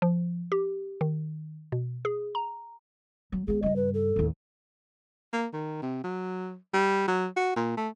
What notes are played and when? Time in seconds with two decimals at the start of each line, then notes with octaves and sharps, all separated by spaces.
0.02 F3
0.52 G4
1.01 D#3
1.72 B2
2.05 G#4
2.35 A#5
3.32 F#3
3.48 G#3 B3 G#4
3.63 G2 C#3 D#5
3.76 B4
3.94 A4
4.16 A1 D#2
5.33 A#3
5.53 D#3
5.82 C3
6.04 F#3
6.73 G3
7.08 F#3
7.36 F#4
7.56 A#2
7.77 A3